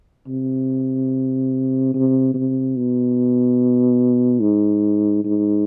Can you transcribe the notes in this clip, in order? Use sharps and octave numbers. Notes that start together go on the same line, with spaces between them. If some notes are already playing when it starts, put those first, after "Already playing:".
C3
C3
C3
B2
G#2
G#2